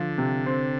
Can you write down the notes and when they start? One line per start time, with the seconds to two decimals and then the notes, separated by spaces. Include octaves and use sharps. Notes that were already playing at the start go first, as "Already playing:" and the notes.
Already playing: D3 F3
0.18 C3
0.46 C4